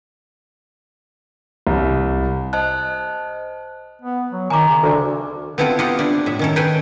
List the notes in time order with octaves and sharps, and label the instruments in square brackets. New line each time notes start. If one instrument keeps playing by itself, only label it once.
[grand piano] C2
[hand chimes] C5 D#5 A5 F#6
[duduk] B3
F#3
[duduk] D#3 [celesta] G#5 A#5 D6
[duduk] C#3
[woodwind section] D2
[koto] B3 C4 E4 F4 A4 B4
F4 G4 D#5 F#5
D4 E4
A2 E5
D#3 C#4 A4
A4 B4 C5 G5 G#5